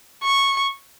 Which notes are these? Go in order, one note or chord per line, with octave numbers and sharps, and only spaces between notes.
C#6